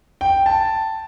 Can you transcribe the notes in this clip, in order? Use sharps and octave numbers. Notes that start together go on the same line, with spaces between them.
G5
A5